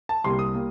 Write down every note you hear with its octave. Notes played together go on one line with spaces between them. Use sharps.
A5
C2 C3 G3 A#3 C6
D#6
G3 A#3